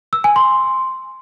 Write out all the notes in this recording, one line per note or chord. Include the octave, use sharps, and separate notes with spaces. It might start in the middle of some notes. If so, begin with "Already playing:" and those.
E6
G#5
C6